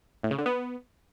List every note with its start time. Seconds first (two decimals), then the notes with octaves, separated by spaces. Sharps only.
0.23 A2
0.31 C#3
0.38 D3
0.46 B3